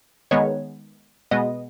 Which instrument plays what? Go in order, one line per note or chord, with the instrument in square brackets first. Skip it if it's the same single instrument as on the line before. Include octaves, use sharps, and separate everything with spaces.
[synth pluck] D#3 G#3 B3 C#5
B2 G#3 B3 D#5